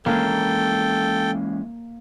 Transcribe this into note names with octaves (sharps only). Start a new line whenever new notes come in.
E3 G#3 A#3 C#4 A4 G5